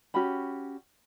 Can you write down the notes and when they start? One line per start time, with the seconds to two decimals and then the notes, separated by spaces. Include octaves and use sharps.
0.14 C#4 F#4 G4 B5